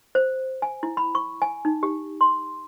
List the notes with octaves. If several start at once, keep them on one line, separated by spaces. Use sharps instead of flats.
C5
G#5
E4
B5
C#6
G#5
D#4
G4
C6